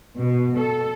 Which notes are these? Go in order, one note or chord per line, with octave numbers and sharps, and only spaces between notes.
B2
A4